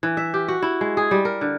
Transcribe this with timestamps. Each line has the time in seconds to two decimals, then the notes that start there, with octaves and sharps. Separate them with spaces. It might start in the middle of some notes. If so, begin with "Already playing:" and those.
0.03 E3
0.17 E5
0.34 G4
0.48 F#4
0.62 E4
0.81 G#3
0.97 G#4
1.11 G3
1.25 A#4
1.41 D3